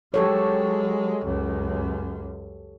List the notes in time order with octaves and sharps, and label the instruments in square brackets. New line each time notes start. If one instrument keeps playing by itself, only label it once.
[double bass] F#3 G#3 [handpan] G4 A4 C#5
[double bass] C#2 F#2